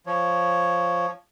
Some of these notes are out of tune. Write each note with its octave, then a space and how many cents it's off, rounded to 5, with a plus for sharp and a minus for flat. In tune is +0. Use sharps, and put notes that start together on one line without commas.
F3 +0 C#5 +0